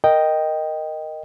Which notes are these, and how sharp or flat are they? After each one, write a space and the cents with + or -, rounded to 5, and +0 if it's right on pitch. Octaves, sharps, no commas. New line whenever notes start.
A#4 +0 D#5 +0 G5 +0